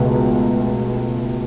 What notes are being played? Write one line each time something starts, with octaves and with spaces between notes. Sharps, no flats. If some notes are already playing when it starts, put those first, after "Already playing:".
Already playing: C#2 B2 A3